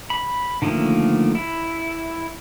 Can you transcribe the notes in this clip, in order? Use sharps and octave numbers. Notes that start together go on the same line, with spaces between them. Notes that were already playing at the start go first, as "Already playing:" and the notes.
B5
D3 D#3 F3 A3 A#3
E4